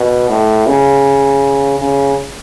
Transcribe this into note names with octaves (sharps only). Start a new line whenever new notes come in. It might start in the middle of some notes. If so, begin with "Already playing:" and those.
Already playing: B2
A2
C#3
C#3